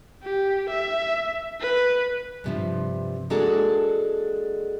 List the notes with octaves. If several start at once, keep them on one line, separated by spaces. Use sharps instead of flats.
G4
E5
B4
G2 C3 F3
G#3 A#3 D4 F#4 G#4 A4